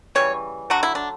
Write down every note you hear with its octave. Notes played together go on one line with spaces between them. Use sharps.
C#3 E3 G3 C#5
D3 F#3 A3 F#4
E4
D4